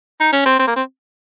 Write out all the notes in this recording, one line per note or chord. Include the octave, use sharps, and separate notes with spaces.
D#4
C#4
C4
C4
A#3
C4